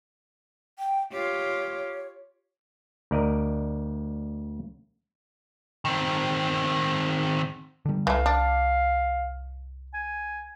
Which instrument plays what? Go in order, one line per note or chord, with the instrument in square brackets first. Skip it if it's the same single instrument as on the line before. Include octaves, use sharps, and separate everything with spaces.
[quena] G5
[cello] F4 G4 [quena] C#5
[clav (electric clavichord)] D2 A#4 D5 D#5
[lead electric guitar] D#3 C4
[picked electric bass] D3 G3
[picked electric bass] C2 [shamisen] E3 A3 [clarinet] F5
[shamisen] D4
[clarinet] G#5